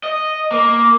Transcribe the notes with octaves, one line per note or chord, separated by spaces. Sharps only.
D#5
A#3